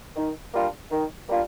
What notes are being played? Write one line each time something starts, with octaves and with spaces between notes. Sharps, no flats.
D#3
G3 A#3 D4 F4
D#3
G3 A#3 D4 F4